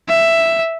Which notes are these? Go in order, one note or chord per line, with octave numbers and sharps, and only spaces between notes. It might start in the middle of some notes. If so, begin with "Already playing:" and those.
E5